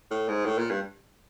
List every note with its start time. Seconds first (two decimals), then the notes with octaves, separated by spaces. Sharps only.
0.11 A2
0.28 G#2
0.46 A2
0.59 A#2
0.71 G2